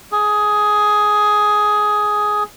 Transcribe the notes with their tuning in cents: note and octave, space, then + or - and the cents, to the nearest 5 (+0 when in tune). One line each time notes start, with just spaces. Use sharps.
G#4 +10